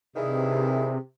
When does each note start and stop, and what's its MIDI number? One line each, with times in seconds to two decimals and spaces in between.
0.16 0.93 43
0.16 0.98 48
0.16 0.93 51
0.16 0.93 52
0.16 0.98 68